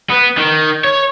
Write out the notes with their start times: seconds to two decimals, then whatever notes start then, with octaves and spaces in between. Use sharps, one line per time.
0.10 B3
0.37 D#3
0.84 C#5